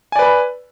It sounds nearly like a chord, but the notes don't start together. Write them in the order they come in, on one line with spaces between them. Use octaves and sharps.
G#5 D5 B4 B5